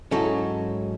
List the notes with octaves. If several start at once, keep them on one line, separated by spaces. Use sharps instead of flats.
G#2 F#3 C#4 E4 A4